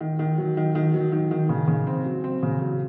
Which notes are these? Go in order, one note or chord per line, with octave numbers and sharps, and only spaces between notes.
D#3
D#3
F#3
D#3
D#3
F#3
D#3
D#3
C#3
C#3
C4
F#3
C4
C#3
F#3